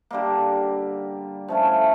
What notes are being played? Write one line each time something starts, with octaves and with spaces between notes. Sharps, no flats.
D3 G3 A#3
F3 A3 C#4 E4